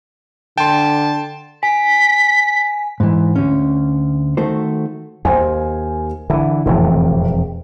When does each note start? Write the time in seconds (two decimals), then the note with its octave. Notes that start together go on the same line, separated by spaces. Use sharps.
0.58 D3 G5 A5 C6
1.63 G#5 B6
3.00 G#2 E3
3.36 D2 C#4
4.37 D#3 A3 F#4 C5
5.25 D#2 C5 G#5
6.30 D3 E3 E4
6.66 E1 A1 F2 C3